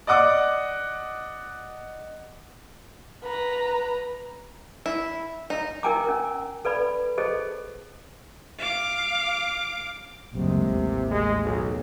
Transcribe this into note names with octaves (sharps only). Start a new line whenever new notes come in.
D5 D#5 F#5 D6
B4 A#5
E4
D#4
D#4 A#4 G5 G#5 A#5 D6
C#4 A#4
A4 B4 D5 B5
G#4 A4 C5 D#5
F5 D6
F#1 D2 C3 G#3
A1 D#2
G#3
B1